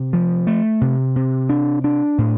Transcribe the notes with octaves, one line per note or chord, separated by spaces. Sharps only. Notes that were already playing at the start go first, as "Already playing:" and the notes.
Already playing: C3
F3
A3
C3
C3
D4
D4
A2